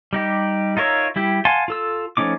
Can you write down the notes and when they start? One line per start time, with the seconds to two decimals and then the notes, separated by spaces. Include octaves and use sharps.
0.13 G3 D#4 G4
0.77 D#4 F4 A#4 C#5 E5
1.16 G3 E4 G4
1.45 F5 F#5 G#5 A5 C6
1.68 F4 A4 E6
2.17 F3 A3 C#4 D#4 D6